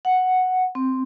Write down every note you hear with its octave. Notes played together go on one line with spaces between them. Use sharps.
F#5
C4